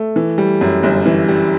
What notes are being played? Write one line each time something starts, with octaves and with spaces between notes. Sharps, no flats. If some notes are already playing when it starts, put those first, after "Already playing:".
Already playing: A3
E3
G3
F#2
G1
E3
G3